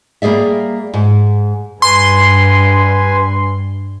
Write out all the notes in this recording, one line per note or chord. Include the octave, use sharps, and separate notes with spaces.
G3 A#3 G#4 D5 E5
G#2
G2 B4 G#5 C6